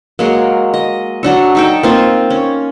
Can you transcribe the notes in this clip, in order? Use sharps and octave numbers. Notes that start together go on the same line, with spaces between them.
F#3 G#3 A#3
D#5
F#3 D4 A4
D#4 A4 G5
A#3 C4 F4
C#4